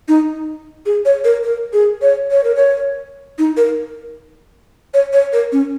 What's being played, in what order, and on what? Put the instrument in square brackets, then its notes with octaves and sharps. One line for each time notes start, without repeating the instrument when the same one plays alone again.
[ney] D#4
G#4
C#5
A#4
A#4
G#4
C#5
C#5
A#4
C#5
D#4
A#4
C#5
C#5
A#4
C#4